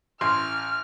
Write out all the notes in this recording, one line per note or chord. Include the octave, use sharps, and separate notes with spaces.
A1 C6 F6